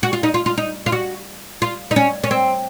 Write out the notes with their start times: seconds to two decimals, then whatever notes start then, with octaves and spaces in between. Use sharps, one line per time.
0.03 F#4
0.13 F4
0.23 D#4
0.34 F4
0.46 F4
0.58 D#4
0.86 F4
0.92 F#4
1.62 F4
1.91 D#4
1.96 C#4
2.24 C#4
2.31 C4